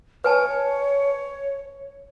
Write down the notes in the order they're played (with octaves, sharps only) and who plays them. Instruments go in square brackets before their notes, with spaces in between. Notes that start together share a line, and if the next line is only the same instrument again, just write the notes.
[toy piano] B4 G#5 A5 [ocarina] C#5